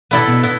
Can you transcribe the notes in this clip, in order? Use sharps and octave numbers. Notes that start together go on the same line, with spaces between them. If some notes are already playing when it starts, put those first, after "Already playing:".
B2 B3 E4 A4 D5
B2
B3 E4